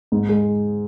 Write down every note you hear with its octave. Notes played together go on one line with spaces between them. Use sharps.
G#2
G#3